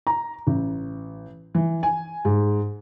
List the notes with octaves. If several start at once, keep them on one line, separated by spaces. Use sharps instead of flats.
A#5
A1
E3
G#5
G#2